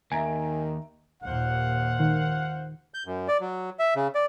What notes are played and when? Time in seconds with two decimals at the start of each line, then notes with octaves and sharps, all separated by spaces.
0.12 D#2 D#3 E5 G#5 A#5 D7
1.23 D#2 A#2 C5 F5 F#5
2.00 D#3
2.94 G6
3.06 F#2
3.28 D5
3.40 F#3
3.79 E5
3.96 C#3
4.15 D5